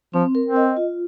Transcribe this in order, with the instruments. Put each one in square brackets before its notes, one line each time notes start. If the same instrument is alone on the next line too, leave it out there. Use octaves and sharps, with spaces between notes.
[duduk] F3 [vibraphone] C4
[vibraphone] A#4
[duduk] C4
[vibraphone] D#5
F4